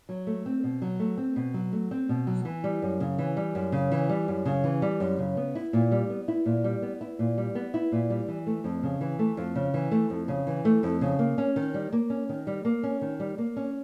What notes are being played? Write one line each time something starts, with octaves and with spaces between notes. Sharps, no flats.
F#3
A3
C4
B2
F#3
A3
C4
B2
F#3
A3
C4
B2
F#3
E3
G3
F#2
C#3
E3
G3
F#2
C#3
E3
G3
F#2
C#3
E3
G3
F#2
C#3
B3
E4
A#2
G3
B3
E4
A#2
G3
B3
E4
A#2
G3
B3
E4
A#2
G3
E3
A3
F2
C#3
E3
A3
F2
C#3
E3
A3
F2
C#3
E3
A3
F2
C#3
A#3
C#4
D#3
G3
A#3
C#4
D#3
G3
A#3
C#4
D#3
G3
A#3
C#4